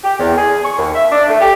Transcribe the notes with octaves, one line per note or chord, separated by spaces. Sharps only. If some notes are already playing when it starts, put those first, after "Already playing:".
G4
E2
G#4
C#6
D#2
E5
D4
A3
G4